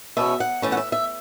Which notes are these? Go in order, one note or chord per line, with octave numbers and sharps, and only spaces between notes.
E2 B2 A3 C#4 E5
F#5
A2 E3 A3 C#4
F#5
E5
E5